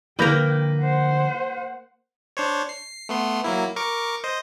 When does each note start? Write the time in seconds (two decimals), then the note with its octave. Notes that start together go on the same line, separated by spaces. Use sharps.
0.19 D3 F3 A#3 A#4 B4 G5 G6 A#6
0.81 C5 F#5
2.37 D4 C5 C#5
2.69 C7
3.09 A3 B3 C6
3.44 F#3 A#3 E4
3.76 A#4 C#6 D6
4.24 C5 D#5